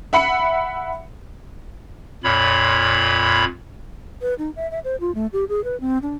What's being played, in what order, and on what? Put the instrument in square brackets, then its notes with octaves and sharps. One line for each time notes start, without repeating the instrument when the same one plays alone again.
[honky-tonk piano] E5 F#5 B5 C#7
[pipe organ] F2 A#2 C#5 B5
[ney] B4
D#4
E5
E5
C5
F4
A3
G4
G#4
B4
C4
D4